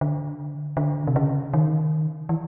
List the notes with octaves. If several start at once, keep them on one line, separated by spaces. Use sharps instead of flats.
D3
D3
C3
C#3
D#3
E3